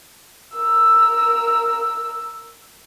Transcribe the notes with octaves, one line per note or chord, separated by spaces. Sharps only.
A#4 E6